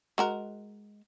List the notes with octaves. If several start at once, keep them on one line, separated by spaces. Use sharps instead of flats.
G#3 F#4 A#4